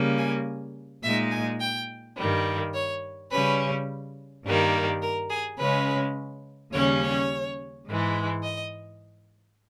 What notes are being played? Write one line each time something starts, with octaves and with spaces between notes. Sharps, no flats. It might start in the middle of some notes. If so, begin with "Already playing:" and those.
Already playing: C#3 G3 A#3
G#5
A#2 G#3 D#4 E5
G#5
G5
G2 D#3 G3
C#5
C#3 G3 C#4 B4
G2 D#3 G3 A#3
A#4
G#4
C#3 G#3 C#4 B4
D#2 C#3 G3 C#4 C#5
C#5
G#2 E3 G#3
D#5